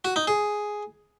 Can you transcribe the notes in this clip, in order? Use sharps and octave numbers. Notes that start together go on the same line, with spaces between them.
F#4
D#4
G#4